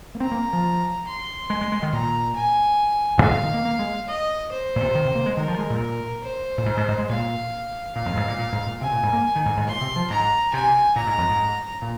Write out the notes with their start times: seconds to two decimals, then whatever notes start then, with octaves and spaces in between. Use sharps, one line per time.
0.15 A#3
0.20 C4 A#5
0.32 A#3
0.53 F3
1.07 C6
1.50 G#3
1.61 G#3
1.72 G#3
1.83 D#3
1.93 A#2 A#5
2.36 G#5
3.17 F2
3.22 G#2 F5
3.32 A#2
3.44 D#3
3.54 A#3
3.65 A#3
3.79 G#3
4.08 D#5
4.51 C5
4.76 A#2
4.84 C3
4.95 D#3
5.05 C3
5.15 A#3
5.26 G#3
5.37 D#3 A#4
5.48 F3
5.59 G#3
5.70 A#2
6.23 C5
6.58 A#2
6.66 G#2
6.77 G#2
6.88 G#2
6.98 G#3
7.09 A#2 F5
7.95 A#2 F5
8.06 F2
8.17 G#2
8.28 A#2
8.38 A#2
8.52 G#2
8.67 A#2
8.81 C3 G#5
8.92 A#2
9.03 G#2
9.13 A#3
9.35 D#3
9.46 G#2
9.57 G#2
9.67 A#2 C6
9.81 C3
9.96 F3
10.10 G#2 A#5
10.53 C3 G#5
10.96 A#2 A#5
11.07 G#2
11.18 F2
11.29 G#2
11.82 A#2